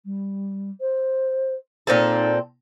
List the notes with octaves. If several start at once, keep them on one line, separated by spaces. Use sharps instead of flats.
G3
C5
A#2 C4 D#4 A4